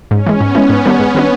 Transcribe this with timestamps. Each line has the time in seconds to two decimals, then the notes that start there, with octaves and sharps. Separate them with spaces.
0.11 G#2 C#4
0.26 E3 G#3
0.40 G#2 B3
0.55 E3 G#3
0.70 G#2
0.85 D#3 G3 B3 D4
1.00 G#2
1.15 D#3 G3 B3 D4